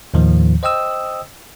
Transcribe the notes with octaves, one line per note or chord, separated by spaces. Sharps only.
D#2 A2 D#3 F3
C5 D#5 G5 D#6 E6